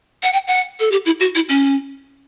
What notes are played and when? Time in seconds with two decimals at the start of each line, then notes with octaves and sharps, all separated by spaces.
0.23 F#5
0.33 G5
0.48 F#5
0.80 A4
0.92 G4
1.06 E4
1.20 F#4
1.35 E4
1.49 C#4